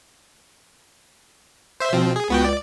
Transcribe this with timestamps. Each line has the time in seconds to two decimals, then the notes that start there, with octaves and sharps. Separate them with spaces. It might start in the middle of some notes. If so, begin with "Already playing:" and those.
1.80 C5 E5
1.93 B2 F3 C4
2.16 G#4
2.30 C#2 B3 F#4 G5
2.45 D5